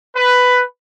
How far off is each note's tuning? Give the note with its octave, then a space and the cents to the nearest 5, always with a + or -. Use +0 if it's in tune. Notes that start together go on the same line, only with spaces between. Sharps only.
B4 +10